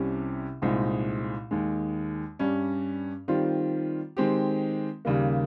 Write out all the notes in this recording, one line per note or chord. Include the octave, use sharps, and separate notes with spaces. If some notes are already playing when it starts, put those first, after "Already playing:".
Already playing: C2 C3 G3 C#4
C2 A#2 G#3 C4 D#4
D#2 D#3 G#3
G2 G3 C#4
D#3 G3 C4 F4
D#3 G#3 C4 G4
D#2 C#3 G3 A#3